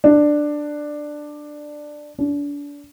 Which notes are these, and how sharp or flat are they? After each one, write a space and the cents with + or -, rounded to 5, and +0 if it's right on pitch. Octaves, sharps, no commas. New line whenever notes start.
D4 +10
D4 -35